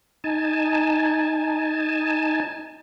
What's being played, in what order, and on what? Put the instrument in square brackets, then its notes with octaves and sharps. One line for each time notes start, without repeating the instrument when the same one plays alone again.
[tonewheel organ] D#4 G#5 A5